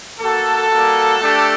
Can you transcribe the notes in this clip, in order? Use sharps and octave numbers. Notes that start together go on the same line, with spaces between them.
A#3 F#4 A4
G3 A#3 F#4
A3 D4 G4